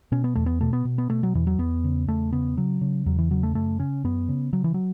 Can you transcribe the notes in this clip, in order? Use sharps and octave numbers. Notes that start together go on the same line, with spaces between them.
B2 C#4
B3
E2 A3
B3
B2 A3
B3
B2
B3
B2 A3
F#3
E2 E3
F#3
E2 B3
C#3
E2 A3
C#3 B3
C#3 F#3
C#3
E2 F#3
E3
C#3 F#3
A3
F#2 A3
C#3 C#4
F#2 B3
C#3
C#3 F#3
E3
F#3